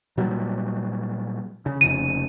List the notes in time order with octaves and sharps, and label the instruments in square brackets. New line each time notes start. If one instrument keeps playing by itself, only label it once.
[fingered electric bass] A#2 F#3 G3
C#3
[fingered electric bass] F1 C#3 [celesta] D#7